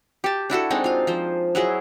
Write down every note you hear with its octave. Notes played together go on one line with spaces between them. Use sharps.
G4 A5
D4 E4 F#4 A4
G#3 C4 D4 D#4
F4 F5
F3 C5
F#3 E4 G#4 D#5